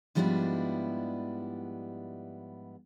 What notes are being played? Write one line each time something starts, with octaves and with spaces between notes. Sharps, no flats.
G#2 F3 G3 B3 D4 E4